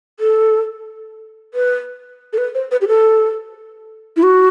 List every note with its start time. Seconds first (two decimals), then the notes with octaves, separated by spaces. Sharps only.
0.20 A4
1.54 B4
2.33 A4
2.38 B4
2.54 C5
2.71 B4
2.81 G4
2.88 A4
4.16 E4
4.23 F#4